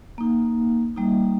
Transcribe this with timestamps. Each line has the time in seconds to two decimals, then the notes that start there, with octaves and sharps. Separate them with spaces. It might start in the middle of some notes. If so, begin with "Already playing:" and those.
0.18 A#3 D#4
0.96 G3 A#3 D#4